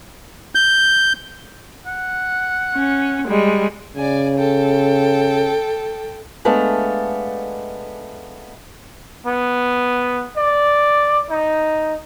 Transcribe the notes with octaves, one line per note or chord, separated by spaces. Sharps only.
G6
F#5
C#4
G3 G#3
C#3 D5 G#5
A4 G5
G#3 A3 B3 D4 A4 F5
B3
D5
D#4